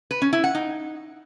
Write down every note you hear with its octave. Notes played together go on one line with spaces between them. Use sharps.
B4
C#4
E4
F#5
D#4